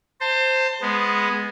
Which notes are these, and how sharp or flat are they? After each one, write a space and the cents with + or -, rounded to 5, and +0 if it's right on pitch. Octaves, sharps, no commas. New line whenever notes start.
C5 +0 A5 +35
G#3 +0 B3 +0